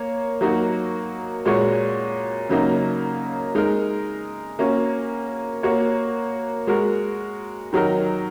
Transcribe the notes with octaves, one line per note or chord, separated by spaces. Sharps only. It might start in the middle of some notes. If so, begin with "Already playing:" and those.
Already playing: A#3 C#5
F#3 A#3 D#4 F#4
A#2 G#3 F#4 C#5
C#3 F#3 A#3 D#4
G#3 D#4 A#4
A#3 C#4 F#4
A#3 F#4 C#5
G#3 F#4 A#4
D#3 F#3 D#4 A#4